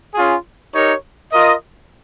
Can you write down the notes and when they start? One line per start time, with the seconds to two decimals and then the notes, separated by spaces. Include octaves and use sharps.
0.14 C#4 F4 G#4
0.74 D#4 G4 A#4 C#5
1.32 F4 A#4 D#5